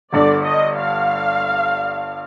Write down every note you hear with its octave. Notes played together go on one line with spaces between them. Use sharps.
G1 G2 D3 D5
D#5
F5